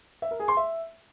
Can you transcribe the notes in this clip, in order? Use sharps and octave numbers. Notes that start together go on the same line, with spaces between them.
E5
A#4
G#4
C6
E5